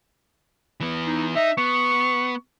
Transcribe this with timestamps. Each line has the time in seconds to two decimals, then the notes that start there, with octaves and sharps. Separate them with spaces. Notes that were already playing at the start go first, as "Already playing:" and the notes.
0.80 E3 B3
1.07 D#4
1.35 D#4 E5
1.57 B3 C#6